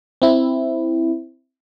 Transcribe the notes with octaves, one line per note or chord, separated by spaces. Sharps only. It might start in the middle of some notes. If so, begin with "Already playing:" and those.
C4 E4